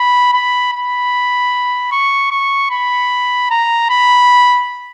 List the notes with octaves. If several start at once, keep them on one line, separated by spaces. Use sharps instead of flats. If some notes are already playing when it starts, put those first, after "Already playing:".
Already playing: B5
B5
B5
C#6
C#6
B5
A#5
B5